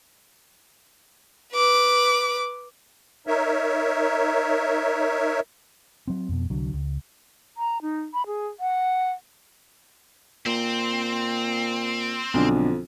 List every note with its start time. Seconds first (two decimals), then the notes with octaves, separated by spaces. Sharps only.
1.54 B4 D6
3.27 D#4 A#4 C#5 E5
6.08 F#3 C4
6.29 F2 B2
6.50 C2 D3 F#3
6.73 C#2
7.57 A#5
7.82 D#4
8.14 B5
8.26 G#4
8.60 F#5
10.46 A#2 C4
12.34 B1 F2 D3 D4